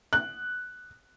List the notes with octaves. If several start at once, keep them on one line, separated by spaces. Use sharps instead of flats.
F#6